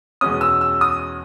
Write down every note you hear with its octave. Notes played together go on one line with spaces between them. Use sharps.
E2 B2 G#3 C#4 D#6
E6
E6
D#6